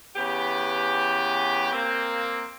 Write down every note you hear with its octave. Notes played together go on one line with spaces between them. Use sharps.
C#3 E3 B3 G4
A#3 C4